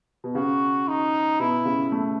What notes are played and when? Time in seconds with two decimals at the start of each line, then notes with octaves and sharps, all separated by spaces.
0.24 B2
0.35 C#3 F#4
0.88 D#4
1.40 B2 E4
1.65 C#3
1.92 A3